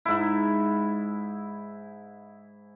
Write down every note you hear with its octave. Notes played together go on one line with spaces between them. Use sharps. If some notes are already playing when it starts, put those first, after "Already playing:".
G#2 E4